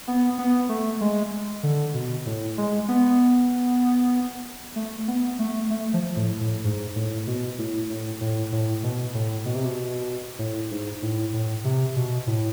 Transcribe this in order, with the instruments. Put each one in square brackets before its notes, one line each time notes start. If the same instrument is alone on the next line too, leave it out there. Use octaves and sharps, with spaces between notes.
[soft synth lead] B3
B3
A3
G#3
D3
B2
A2
G#3
B3
A3
B3
A3
A3
F3
A2
A2
G#2
A2
B2
A2
A2
A2
A2
B2
A2
B2
C3
B2
A2
G#2
A2
A2
C3
B2
A2